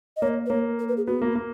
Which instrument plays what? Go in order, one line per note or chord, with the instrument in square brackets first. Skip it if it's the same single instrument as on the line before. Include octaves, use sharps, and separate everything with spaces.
[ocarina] D#5
[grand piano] A#3 [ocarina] C#5
[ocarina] B4
[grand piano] A#3 [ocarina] C#5
[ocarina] A#4
B4
G#4
[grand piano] B3 [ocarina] F#4
[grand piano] A#3
A#3